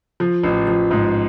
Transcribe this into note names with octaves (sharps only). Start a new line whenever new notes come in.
F3
A1
F3
G#2